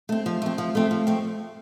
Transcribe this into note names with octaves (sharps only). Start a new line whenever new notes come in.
A3 C4
F3
A3 C4
F3
A3 C4
F3
A3 C4